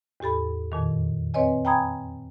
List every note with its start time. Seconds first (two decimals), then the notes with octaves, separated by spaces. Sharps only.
0.20 E2 A2 G4 A4 B5
0.72 F2 A#2 D#3
1.34 C4 B4 C#5 D#5 G#5
1.65 G5 G#5 A#5 B5 D#6 G#6